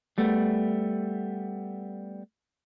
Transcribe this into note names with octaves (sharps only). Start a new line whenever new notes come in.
G3 A3 B3